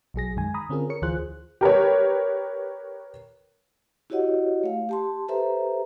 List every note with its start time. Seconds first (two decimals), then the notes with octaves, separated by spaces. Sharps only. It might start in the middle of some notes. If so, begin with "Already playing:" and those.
0.14 B1 F#3 G#4 A#6
0.36 F#2 D#3 G#3 G#5
0.54 A#5 B5 D#6
0.69 D3 C4 C#4 F4 G#4 A#4
0.90 A#4 C#5 C#7
1.02 D2 E3 F4 G#4 C5 F#6
1.61 G4 A#4 B4 C#5
4.10 E4 F#4 G4 C#5 D#5 F#5
4.64 A3 F5
4.89 G4 A5 C6
5.28 G4 A4 B4 C5 E5 A#5